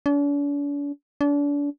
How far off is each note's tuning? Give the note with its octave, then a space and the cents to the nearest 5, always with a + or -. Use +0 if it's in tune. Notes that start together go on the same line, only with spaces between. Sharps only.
D4 -45
D4 -35